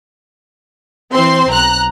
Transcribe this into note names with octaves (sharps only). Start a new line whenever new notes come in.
E3 C4 C5 C6
B1 A#5 F#6